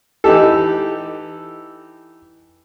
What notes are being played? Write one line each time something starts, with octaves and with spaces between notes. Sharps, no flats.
E3 D#4 G4 A4